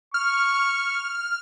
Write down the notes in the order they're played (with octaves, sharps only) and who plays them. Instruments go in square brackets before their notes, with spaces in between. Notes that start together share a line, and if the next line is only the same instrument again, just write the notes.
[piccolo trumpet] C#6 [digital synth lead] F6